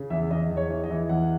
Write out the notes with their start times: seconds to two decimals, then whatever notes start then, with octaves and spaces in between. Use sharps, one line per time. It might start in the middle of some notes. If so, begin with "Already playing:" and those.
Already playing: C#3
0.10 E2 E5
0.30 E2 D#5
0.51 E2
0.57 C#5
0.70 E3
0.84 D#5
0.90 E3
1.09 E2 F#5